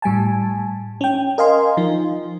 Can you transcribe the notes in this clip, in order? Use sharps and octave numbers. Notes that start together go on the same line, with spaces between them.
A2 G3 G#5 A5
C#4 G5
A#4 D#5 F5 G#5 C6
F3 D#4